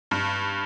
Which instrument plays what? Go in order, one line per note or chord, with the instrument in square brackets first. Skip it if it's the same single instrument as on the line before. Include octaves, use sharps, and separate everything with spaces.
[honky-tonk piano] G2